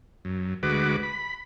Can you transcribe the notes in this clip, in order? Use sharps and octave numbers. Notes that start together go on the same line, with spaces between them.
F#2
D2 G#3 F#4 B4 D6
B5